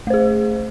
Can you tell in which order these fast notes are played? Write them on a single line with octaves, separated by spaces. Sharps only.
A3 C5 G#4